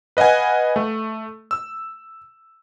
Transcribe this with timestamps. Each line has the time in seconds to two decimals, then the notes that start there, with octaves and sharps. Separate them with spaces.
0.17 B4 D#5 F5 F#5 G#5
0.76 A3
1.51 E6